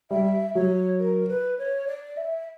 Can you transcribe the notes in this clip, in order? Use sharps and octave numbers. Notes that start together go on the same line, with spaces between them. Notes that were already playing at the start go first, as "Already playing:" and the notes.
G3 E5
F#3 C#5
A#4
B4
C#5
D5
E5